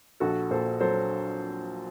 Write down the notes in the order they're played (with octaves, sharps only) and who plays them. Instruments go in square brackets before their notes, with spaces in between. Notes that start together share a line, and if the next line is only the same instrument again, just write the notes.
[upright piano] A#1 F#4 A4
A#2 A4 C5
F#3 A4 C5